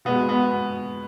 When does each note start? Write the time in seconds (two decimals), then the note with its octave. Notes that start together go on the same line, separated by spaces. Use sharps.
0.05 B2 G#3 B3
0.29 B3